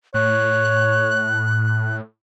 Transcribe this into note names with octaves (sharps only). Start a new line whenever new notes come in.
A2 C#5 F#6